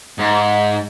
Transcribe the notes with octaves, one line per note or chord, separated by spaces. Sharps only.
G#2